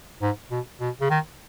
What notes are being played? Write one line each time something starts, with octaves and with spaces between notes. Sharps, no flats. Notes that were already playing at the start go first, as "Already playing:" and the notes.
G#2
B2
B2
C#3
D#3